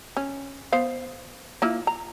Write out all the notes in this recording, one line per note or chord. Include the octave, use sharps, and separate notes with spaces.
C#4
B3 C5 F5
A#3 E4 F4
A#5